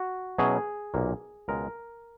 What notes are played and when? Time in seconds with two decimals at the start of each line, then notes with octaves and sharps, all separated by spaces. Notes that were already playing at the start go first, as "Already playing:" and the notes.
Already playing: F#4
0.38 B2 F#3 C#4 E4 G#4
0.94 B1 A#2 A#3
1.48 C#2 B2 G#3 A#4